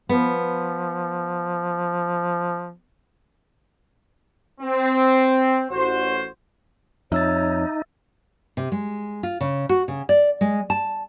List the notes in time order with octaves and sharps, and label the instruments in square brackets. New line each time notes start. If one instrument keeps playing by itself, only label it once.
[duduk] F3 [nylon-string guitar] B3
[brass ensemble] C4
A1 F#4 C5
[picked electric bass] F2 [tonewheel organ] D#4 [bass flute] C#5 [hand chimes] E5 E6 A6
[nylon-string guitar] C3
G#3
F4
C#3
F#4
C#3
D5
G#3
A5